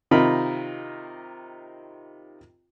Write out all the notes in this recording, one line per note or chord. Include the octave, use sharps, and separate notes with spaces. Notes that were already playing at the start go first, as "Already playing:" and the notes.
C3 D#3 D#4 F4 A#4 B5